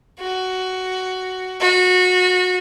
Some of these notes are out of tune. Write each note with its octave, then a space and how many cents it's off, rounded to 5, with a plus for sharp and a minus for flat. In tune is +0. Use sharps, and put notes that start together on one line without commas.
F#4 +10
F#4 -25